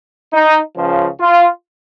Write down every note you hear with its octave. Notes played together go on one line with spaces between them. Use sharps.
D#4
C#2 C#3 F3
F4